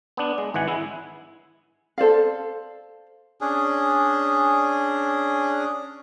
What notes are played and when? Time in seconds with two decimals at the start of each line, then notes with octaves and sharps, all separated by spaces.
0.17 B3 D4
0.38 G#3
0.54 G#1 E3 F#5 G#5
0.68 G#3 E4
1.98 A4 C5 D5 F5
3.41 C#4 D4 G#4